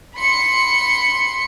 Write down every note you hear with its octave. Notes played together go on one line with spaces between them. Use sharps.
B5 C6 C#7